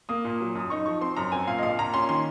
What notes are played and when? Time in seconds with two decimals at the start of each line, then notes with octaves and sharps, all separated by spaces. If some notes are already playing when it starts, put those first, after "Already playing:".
0.09 A#3 D#6
0.25 A#2
0.41 F#3
0.55 F#2 D#6
0.70 D#4 C#6
0.86 F3 C#6
1.01 C4 C6
1.17 F#2 A#5
1.32 C4 G#5
1.47 A#2 F5
1.58 D#5
1.63 A#1 F5
1.78 A#2 A#5
1.94 C#4 C6
2.09 D#3 C6